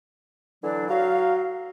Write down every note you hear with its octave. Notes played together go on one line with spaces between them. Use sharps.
D3 E3 F#3 D4
F#3 F5